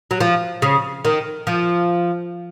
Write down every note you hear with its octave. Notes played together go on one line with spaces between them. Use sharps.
F#3
F3
C#3
D#3
F3